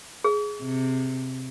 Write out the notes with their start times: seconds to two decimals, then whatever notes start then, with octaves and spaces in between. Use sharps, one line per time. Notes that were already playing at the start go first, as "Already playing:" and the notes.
0.24 G#4
0.62 C3